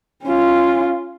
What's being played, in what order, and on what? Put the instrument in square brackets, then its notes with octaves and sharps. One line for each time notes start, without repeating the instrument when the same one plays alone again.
[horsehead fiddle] C#4 F4